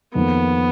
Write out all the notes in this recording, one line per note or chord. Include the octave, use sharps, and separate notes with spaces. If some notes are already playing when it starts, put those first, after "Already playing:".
F2 D#3 A#3 B3